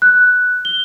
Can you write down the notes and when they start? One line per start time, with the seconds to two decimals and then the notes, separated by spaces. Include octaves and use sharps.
0.02 F#6
0.65 G7